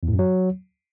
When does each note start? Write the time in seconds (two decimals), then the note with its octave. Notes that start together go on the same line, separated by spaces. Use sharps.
0.03 E2
0.08 A2
0.14 F#2
0.19 F#3